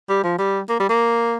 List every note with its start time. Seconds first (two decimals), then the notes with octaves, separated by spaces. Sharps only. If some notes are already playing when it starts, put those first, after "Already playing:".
0.09 G3
0.24 F3
0.38 G3
0.69 A#3
0.80 G3
0.89 A#3